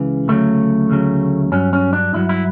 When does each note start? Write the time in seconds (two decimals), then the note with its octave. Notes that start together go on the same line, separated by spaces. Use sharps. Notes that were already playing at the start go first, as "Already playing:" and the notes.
Already playing: C#2 C#3 E3
0.28 D2 C#3 F#3 A3
0.90 D2 C#3 F#3
1.52 G2 F#3 C#4
1.73 C#4
1.93 D4
2.14 G2 F#3 E4
2.29 E4